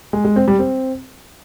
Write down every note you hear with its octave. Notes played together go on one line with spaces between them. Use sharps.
G#3
G#3
C4
G3
C4